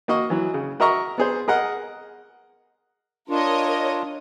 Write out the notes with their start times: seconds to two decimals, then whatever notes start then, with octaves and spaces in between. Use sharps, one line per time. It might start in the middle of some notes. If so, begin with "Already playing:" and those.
0.08 A#3 F#4 D#5 C#6
0.30 E3 F#3
0.54 C#3
0.80 F#4 A#4 D#5 E5 A#5 C#6
1.18 B3 G#4 C5
1.48 G#4 A#4 D#5 F#5
3.30 D4 F4 A#4 C#5 D#5